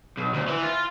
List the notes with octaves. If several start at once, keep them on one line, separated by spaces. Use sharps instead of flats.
B1
D2
E3
F4